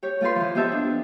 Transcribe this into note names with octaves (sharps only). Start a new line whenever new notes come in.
G4 C#5
A3 F4 G4 B4 C6
E3 F3
B3 D#4 G4 E5 A5
D4